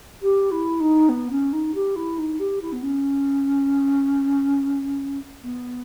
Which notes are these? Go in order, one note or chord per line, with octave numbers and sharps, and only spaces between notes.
G4
E4
D#4
B3
C#4
D#4
G4
E4
D#4
G4
E4
B3
C#4
B3